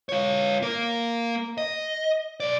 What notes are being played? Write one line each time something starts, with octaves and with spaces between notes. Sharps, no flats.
F4 C#5
A#3 A#4
D#5
B1 D5